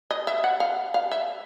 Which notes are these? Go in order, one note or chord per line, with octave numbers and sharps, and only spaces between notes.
D#5
E5
F#5
F5
F5
E5